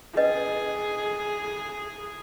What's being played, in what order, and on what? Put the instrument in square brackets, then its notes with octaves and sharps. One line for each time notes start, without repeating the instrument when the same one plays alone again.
[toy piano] C#4 B4 D#5 [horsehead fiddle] G#4